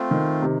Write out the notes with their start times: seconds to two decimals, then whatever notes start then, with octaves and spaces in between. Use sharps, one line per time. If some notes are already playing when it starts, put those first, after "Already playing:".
Already playing: A3 C4 F4
0.11 D#3
0.42 C3